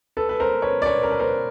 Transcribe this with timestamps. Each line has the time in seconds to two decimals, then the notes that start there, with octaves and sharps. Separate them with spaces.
0.17 A4 B4
0.29 B4
0.40 A#4 C5
0.62 B4 C#5
0.82 D5
0.86 B4 C#5
1.03 A#4
1.11 B4
1.19 A#4 C5